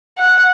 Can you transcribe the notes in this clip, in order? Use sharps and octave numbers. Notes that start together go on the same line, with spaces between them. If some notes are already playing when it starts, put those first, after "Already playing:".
F#5